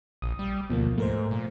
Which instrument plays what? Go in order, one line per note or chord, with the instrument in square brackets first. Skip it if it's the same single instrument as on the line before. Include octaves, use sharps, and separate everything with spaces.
[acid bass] A#1 [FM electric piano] D#6
[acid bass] G3
[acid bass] D2 [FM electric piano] B2 F3 A#3
[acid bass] G#2 [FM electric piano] A3 A#4 C5
[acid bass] A#2